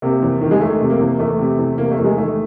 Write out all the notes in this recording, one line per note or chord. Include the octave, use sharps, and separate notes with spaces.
C3 A#3
E2
D#3
G#3
E2 A3
C3
A#3
E2
E2 A3
C3
E2
C3 A#3
A3
E2
G#3
D#3 A3